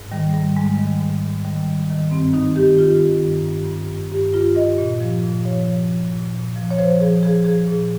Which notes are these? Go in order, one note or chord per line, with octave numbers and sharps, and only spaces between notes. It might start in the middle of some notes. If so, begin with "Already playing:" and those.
Already playing: G#2
D#3 G3
G#2 G3
G#2 G#3
D#3 G3
G#2
G#2
D#3 G3
D#3
D#3
G2 C4
D#3 D#4
D#3 G4
D#3 F4
D#3
G2
G2
G2
G2
G2 G4
G2 F4
G2 D#5
A#2
F3
A#2
F3 C#5
F3
F3
A#2
A#2
F3
C#5
F3 C5
F3 G#4
F3 G#4
F3 G#4
A#2 G#4